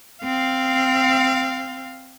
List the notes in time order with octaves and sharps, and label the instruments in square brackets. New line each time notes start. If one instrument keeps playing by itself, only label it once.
[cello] C4 F5